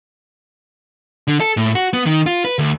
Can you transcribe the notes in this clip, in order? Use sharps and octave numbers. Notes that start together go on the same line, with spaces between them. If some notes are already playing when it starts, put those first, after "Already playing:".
D3
A4
A2
F#4
B3
D#3
F4
B4
D2